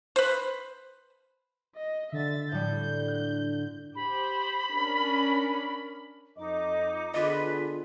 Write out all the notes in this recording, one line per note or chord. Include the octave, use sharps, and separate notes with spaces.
B4 C5
D#5
D3 E5 A6
A2 G3 G6
F#6
G4 C5 B5
C#4 D4 A#4
F2 D#4 D#5 D6
D3 B3 F4 G#4 B4 D#5 D6